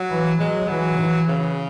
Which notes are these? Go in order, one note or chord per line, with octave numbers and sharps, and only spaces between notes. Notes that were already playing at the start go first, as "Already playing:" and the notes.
Already playing: F#3
E3
F#3 G#3
E3 F#3
E3
C#3